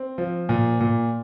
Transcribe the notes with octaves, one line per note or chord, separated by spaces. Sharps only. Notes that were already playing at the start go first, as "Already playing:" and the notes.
Already playing: C4
F3
A#2
A#2